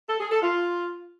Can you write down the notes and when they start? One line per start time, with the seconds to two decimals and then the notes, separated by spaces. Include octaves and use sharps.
0.08 A4
0.19 G#4
0.31 A4
0.42 F4